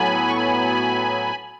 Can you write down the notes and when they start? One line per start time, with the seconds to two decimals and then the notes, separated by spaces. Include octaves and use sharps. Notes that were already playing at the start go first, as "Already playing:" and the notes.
Already playing: A2 F#3 B3 G#5 B5
0.28 C#6
0.36 G#5 B5